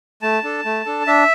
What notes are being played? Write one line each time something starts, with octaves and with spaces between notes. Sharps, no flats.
A3 A5
D4 A4
A3
D4 A4
D4 E5